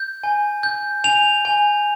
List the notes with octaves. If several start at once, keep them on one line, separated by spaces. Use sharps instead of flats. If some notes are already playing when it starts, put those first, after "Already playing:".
Already playing: G6
G#5
G6
G#5 F7
G#5